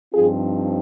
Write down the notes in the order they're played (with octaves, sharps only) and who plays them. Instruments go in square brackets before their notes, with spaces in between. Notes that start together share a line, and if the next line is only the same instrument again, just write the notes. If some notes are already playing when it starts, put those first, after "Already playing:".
[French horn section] G2 F3 C4 D#4 F4 G#4